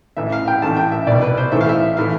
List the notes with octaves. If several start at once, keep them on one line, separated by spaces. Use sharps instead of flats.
A1 A2 E3 E5
F5
G5
A1 A2 E3 A5
G5
E5
C2 B2 D5
B4
C5
B1 A2 E3 E5
F5
E5
A2 E3 F5